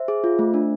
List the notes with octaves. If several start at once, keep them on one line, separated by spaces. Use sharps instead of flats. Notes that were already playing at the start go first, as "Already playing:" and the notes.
Already playing: C5 E5
G#4
F4
A3
D4